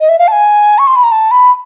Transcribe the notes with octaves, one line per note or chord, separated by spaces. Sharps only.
D#5
E5
F5
A5
G#5
C#6
C6
B5
A#5
A5
B5